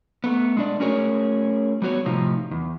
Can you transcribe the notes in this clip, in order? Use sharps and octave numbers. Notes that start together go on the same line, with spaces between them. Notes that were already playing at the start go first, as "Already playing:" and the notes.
A3 B3
G#3 D4 D5
A3 C#4 F#4 G#4 A#4 C#5
G3 B3 F#4 C#5
A2 C3 F3 D#4
E2